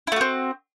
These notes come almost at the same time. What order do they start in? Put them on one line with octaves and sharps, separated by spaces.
E4 A3 F#4 C4